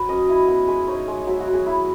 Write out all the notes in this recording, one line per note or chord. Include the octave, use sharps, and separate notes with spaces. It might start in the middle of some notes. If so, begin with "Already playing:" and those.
Already playing: F#3 B4
C#4 D#5
E4
B3
G#3
D#4 C#5
G#3
F#3 E5
F#4
F#3
G#4
E4